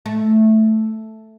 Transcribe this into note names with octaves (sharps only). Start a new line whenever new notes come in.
A3